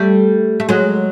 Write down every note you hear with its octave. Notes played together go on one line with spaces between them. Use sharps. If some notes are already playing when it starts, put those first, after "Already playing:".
Already playing: G3 A3
A3
F#3 G#3